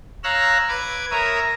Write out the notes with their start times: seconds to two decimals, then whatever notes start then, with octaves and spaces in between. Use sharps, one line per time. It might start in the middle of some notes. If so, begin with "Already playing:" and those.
0.24 C#5 F5 A#5 E6 F#6
0.69 B4 D6 G#6
1.11 A#4 C#5 E5 A#5 D#6